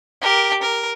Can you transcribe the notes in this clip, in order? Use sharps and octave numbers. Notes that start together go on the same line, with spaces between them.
G4 A#4
A#4